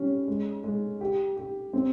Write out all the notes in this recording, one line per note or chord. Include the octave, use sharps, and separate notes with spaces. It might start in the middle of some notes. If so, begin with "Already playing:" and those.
Already playing: G3 C#4
G#3
G#3
G4
G4
C4